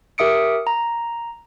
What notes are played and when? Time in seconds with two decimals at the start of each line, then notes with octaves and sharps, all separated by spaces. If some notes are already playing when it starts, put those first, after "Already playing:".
0.18 G4 A#4 E5 D#6 C#7 D7
0.67 A#5